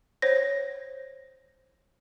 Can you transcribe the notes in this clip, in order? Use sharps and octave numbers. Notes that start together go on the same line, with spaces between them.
C5 C#5 A#6